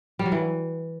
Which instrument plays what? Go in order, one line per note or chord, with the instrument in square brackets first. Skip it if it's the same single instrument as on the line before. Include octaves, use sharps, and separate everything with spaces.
[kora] G3
F#3
E3